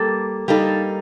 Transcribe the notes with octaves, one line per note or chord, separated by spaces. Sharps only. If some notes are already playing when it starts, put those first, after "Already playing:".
Already playing: G3 A#3 A4
G3 A#3 D#4 A4